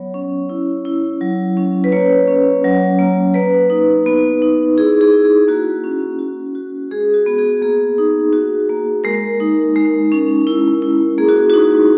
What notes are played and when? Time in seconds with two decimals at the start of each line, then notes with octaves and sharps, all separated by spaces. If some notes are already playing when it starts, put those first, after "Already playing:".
Already playing: F#3 B3 C#5
0.14 C#4
0.49 E4
0.85 E4
1.21 F#3
1.57 C#4
1.84 B4
1.92 A#3 C#5
2.27 C#4
2.64 F#3
2.99 A#3
3.34 A#3 B4
3.70 D#4
4.06 B3
4.42 D#4
4.78 E4 G#4
5.01 G#4
5.13 E4
5.25 G#4
5.48 A#3 F#4
5.84 C#4
6.19 F#4
6.55 F#4
6.91 G#3 G#4
7.14 F#4
7.26 B3
7.38 G#4
7.61 A#3 G#4
7.98 D#4
8.33 F#4
8.69 A#3
9.04 G#3 A#4
9.40 D#4
9.76 G#3
10.12 C#4
10.47 E4
10.82 E4
11.18 A#3 G#4
11.28 F#4
11.50 D#4 F#4